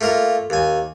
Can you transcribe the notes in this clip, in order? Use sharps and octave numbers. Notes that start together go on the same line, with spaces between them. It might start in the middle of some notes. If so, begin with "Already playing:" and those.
A3 A#3 F4 A#4
D#2 G#5